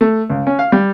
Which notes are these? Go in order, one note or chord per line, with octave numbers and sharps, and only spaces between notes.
A3
C#2
C#4
F5
G3